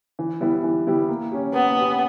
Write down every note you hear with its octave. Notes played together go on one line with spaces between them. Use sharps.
E3
G3 B3 E4 G4
E3
G3 B3 E4 G4
A#3
C#4 G4
A#3 B3
C#4 G4